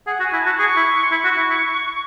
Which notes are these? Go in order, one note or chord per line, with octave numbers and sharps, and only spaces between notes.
G#4 F#5
F#4
G#5
E4
F#4 A5
G#4 C#6
E4
C6
E4 C#6
F#4
E4
E4